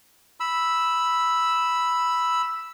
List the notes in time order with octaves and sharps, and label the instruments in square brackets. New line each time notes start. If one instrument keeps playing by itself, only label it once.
[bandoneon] B5 E6